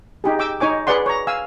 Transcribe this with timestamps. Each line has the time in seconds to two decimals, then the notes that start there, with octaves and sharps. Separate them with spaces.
0.24 D#4 G4 G#4
0.39 G5 D6 E6
0.60 D#4 C#5 G#5 D6
0.87 G#4 B4 D5 F#5 C6
1.06 C#5 A#5
1.27 F5 G#5 E6